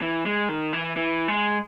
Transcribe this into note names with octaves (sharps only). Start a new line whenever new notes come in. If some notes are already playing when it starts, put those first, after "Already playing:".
E3
G#3
D#3
E3
E3
G#3